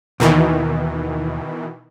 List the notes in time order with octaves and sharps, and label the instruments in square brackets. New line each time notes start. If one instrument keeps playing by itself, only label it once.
[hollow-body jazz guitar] D#2 [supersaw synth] B2 D#3 E3